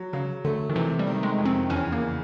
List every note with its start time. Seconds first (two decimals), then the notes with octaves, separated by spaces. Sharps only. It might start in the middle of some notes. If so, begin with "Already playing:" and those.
Already playing: F#3
0.13 C#3 F#3
0.45 D3 A3
0.70 D#3
0.75 C3 E3
0.99 G3
1.07 D#3
1.23 G#3
1.38 F2
1.45 C4
1.70 E2 C#4
1.92 A#3
2.01 C#3